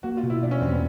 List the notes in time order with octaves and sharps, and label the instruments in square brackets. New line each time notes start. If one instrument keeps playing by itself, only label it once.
[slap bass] A#3 [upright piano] F#4
[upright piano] F4
[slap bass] B2
[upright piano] E4
[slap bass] B2 [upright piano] D4
[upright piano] C#4
[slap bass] E2 [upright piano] C4
[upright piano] B3